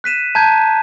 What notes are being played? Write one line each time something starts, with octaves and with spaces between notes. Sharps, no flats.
F#6 B6 D#7 E7
A5 A#5 G6 G#6